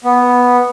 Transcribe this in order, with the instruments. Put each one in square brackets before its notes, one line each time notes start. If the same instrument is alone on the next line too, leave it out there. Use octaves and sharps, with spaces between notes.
[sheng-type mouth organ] B3